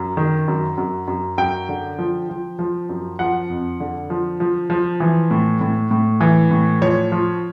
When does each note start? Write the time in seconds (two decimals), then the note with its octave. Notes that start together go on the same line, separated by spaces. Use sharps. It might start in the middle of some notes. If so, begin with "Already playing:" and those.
Already playing: F#2
0.17 D#3
0.48 F#2
0.78 F#2
1.08 F#2
1.38 F#2 G5
1.69 D3
1.99 F3
2.29 F3
2.59 F3
2.89 F#2
3.19 F3 F#5
3.50 F2
3.80 D3
4.10 F3
4.40 F3
4.70 F3
5.00 E3
5.31 A2
5.61 A2
5.91 A2
6.21 E3
6.51 A2
6.81 F3 C#5
7.12 F3